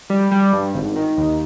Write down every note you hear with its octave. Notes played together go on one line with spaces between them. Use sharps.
G3
G3
G2
G#1
D#3
D#2